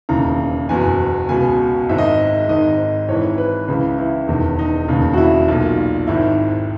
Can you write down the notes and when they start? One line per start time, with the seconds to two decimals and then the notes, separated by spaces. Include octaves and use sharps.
0.09 E1 D#2 C#3 E3 A#5
0.69 F#1 E2 B2 G#5
1.29 C#2 B2 G#5
1.89 G#1 G#2 D#3 E5
1.98 D#5
2.06 E5
2.48 G#1 G#2 D#3 D#5
3.08 G#1 G#2 E3 C#5
3.38 B4
3.68 C#2 C#3 E3
3.98 E4
4.28 E1 E2 D#3
4.59 D#4
4.88 E1 D#2 C#3
5.13 F#4
5.17 E4
5.48 B1 A#2
6.07 G#1 G#2 D#3 E4